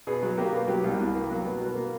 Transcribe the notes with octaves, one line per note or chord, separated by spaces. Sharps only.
B2 G#4
F#3
A#3 G4
B2
F#3 G4
C2
C2
A#3
F#3
B2
B2
A#3